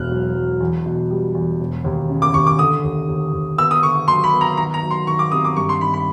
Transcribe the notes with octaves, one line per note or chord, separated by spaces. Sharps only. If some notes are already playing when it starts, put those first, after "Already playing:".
Already playing: E1 B2 F6 F#6
F#3
F#3
E2
B2
G3
E2
E1
D#2
C#3
D6
D#2 C#6
D6
D3 D#6
D#2
D#2
D#2
B3 E6
D#6
D3 C#6
F#3 C6
B5
B3
A#5
D#3 A#5
A#5
F#3
C6
D#3 C#6
D6
C3 D#6
D6
G2 C#6
C6
D#3 B5
B5